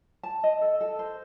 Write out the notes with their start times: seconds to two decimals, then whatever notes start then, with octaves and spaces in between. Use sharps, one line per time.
0.23 A5
0.44 D#5
0.61 A4
0.81 A4
0.99 C5